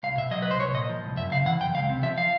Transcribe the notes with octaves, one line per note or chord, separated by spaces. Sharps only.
C2 F5
B2 E5
F#3 D#5
C2 B4
C5
C2 C#5
A#2 D#5
F3
C2
F#2 E5
C#3 F5
E3 F#5
F#2 G5
C#2 F5
C3
F3 E5
F5